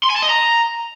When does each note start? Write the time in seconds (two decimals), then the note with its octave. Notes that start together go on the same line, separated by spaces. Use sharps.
0.03 C6
0.10 G#5
0.16 A5
0.23 D#5
0.29 A#5